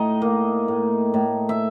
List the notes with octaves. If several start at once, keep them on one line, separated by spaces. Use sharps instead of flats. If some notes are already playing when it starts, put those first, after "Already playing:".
Already playing: A2 D#4 D#5
A#3
A2
A2
E5